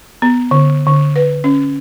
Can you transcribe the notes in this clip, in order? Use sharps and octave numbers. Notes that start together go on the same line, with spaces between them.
B3
D3
D3
B4
C#4